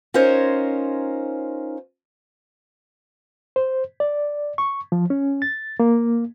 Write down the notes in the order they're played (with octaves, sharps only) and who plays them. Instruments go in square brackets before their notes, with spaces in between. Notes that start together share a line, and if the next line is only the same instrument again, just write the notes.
[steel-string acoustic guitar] C#4 D#4 F4 A#4 C5 C#5
[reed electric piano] C5
D5
C#6
F3
C#4
A6
A#3